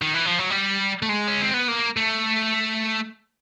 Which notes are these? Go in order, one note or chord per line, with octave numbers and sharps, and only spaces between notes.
D#3
E3
F3
F#3
G3
A3
G#3
C#4
C4
B3
A#3
A3